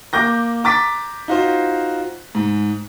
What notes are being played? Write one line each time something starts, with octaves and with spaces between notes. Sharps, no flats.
A#3 D6 G6 A#6
A#5 D6 A6 B6
D#4 F4 F#4 C5
G#2